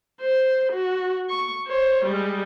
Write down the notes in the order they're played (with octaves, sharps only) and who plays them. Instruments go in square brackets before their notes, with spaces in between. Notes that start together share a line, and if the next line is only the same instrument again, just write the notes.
[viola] C5
F#4
C#6
C5 C#5
G3 G#3